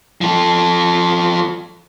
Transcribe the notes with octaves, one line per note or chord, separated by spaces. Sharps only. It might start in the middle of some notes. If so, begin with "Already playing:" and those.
F3 A4